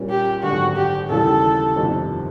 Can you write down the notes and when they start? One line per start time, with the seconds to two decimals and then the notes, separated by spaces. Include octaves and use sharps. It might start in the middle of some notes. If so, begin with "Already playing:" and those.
Already playing: A#2 G3 A#3 C#4
0.10 G4
0.43 G#1 F#2 D3 F#4
0.76 G4
1.10 D#2 C#3 E3 G3 A4
1.75 G1 F2 C3 D#3